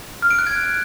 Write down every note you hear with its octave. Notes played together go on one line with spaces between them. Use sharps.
F6
D7
F#6
G#6